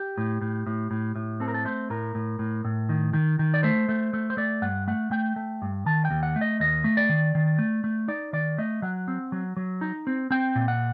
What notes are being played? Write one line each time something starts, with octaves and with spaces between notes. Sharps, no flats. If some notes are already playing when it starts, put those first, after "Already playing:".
Already playing: G4
A2
A2
A2
A2
A2
C4 A4
A#4
A4
A3 C5
A2 A#4
A2
A2
A2
D#3
D#3
D#3
D5
A3 C5
A3
A3
C5
A3 D5
G2 F#5
A3 F#5
A3 G5
A3
G2
D#3 A5
G5
D#2
F#5
A3
D#5
D#2 D#5
A3
D5
D#3
D#3
A3
A3
D#4 D5
D#3 D5
A3 D#5
F#3 F#5
C4
F#3
F#3
D#4
C4
C4 G5
A#2
F#5